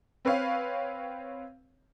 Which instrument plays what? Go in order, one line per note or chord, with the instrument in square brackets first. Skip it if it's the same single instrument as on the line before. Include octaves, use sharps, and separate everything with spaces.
[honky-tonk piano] C4 B4 C#5 F5